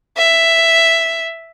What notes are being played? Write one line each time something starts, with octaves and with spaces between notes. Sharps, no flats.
E5